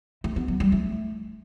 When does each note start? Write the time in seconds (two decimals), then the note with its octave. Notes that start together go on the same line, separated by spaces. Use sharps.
0.24 A3
0.36 B3
0.48 F#3
0.60 G3
0.72 A3